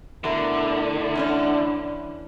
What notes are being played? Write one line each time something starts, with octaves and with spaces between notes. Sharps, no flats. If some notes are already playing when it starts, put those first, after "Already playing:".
B2 D3 A3 E4 A#4
E3 C#4 D4